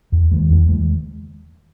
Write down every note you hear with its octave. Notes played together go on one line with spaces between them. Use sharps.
E2
D#3 G#3
E2
D#3 G#3